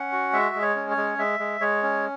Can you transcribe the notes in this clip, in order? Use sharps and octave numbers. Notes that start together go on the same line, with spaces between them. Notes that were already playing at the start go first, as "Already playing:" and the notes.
Already playing: C#4 F#5
F#4
G#3 E5
G#3
C#5
C#4
C#5
G#3
G#3 E5
G#3
G#3 C#5
C#4